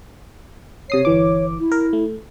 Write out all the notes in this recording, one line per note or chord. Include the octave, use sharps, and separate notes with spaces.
C3 C#5 D#6 C7
G1 E3 D6
E4
A#4
A3